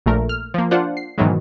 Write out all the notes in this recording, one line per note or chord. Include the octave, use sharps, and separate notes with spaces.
A#1 A#2 A3 A#4
F6
F3 A#3
D4 F4 C5 F#5
C7
G#2 B2 D#3 E3 F#3 G#3